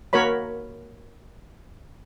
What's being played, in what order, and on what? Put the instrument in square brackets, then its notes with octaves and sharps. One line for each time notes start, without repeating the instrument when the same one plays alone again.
[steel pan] A#3 F#4 A#4 C#5 B5